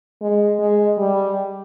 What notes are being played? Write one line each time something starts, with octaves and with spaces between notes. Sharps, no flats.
G#3
G#3
G3